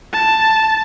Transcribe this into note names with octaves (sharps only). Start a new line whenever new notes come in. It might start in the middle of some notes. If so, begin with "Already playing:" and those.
A5